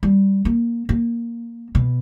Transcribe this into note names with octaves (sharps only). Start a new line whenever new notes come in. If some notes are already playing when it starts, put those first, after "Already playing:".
G3
A#3
A#3
B2